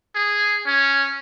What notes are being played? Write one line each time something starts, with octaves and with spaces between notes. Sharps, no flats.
G#4
C#4